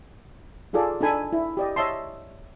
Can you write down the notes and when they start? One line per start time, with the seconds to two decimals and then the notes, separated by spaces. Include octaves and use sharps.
0.73 D#4 F4 G#4 A4 D5
1.01 D4 D#4 A4 G#5 B5
1.33 E4
1.57 G4 D5 D#5
1.76 C#5 D#5 E5 A5 C6